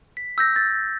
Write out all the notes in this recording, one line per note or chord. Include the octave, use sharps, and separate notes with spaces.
B6
E6 G6 A#6
A6